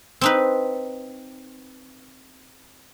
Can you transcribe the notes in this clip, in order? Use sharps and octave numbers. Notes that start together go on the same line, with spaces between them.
C4 D#4 B4